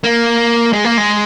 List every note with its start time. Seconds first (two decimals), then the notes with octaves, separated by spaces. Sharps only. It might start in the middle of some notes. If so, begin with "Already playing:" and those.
0.04 A#3
0.73 G#3
0.85 A#3
0.98 G#3